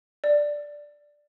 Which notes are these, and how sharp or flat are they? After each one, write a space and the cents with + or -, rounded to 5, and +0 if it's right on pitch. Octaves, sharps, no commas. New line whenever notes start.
D5 +0